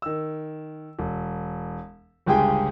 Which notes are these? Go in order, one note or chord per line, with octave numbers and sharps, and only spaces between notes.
D#3 E6
E1
G1 C#2 G4 G#4 G5 G#5